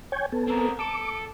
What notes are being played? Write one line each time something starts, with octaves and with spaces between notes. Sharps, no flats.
C#5 G5 G#5
B3 A4
C4 A#4
A4 D6